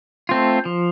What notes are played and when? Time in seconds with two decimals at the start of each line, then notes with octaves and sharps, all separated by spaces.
0.29 A3 C4 F4
0.65 F3